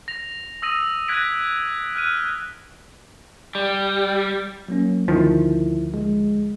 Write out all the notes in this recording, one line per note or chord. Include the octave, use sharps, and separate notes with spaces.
A#6 F7
D#6 E6 A#6 D#7
F#6 G#6 A#6 B6 D7 D#7
F6 F#6 D#7
G3
F#3 A#3 C#4
D2 D#3 F3 E4
G#3